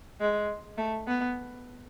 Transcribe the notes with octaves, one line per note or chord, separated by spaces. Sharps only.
G#3
A3
B3